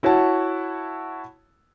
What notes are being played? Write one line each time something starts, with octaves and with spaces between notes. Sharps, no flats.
E4 F#4 C#5 F#5 A5